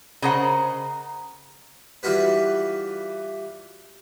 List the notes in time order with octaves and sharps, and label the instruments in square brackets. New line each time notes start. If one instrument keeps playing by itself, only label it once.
[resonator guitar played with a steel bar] C#3 C5 F#5 [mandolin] A#4 D#5 A#5
[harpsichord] E3 G3 F4 F#4 B4